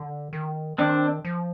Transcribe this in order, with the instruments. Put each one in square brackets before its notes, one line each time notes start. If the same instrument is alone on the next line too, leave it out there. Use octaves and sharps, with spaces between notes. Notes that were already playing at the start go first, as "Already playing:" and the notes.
Already playing: [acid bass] D3
D#3
[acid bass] D#3 [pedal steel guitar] C4 D4
[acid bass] F3